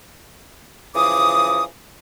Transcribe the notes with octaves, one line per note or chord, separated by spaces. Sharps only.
C#3 E3 F3 D6 D#6